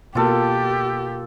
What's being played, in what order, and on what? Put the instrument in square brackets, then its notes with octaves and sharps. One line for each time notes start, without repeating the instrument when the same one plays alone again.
[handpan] B2 A#3 [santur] F4 A4 [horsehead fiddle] G4